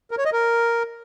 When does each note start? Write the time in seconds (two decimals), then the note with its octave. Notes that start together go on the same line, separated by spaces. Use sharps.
0.11 A#4
0.18 C#5
0.25 D#5
0.32 A#4